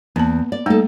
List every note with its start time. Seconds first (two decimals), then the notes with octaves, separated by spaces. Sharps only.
0.16 E2 A#3 A5
0.52 D5
0.66 G3 A3 A#3 D#4 A4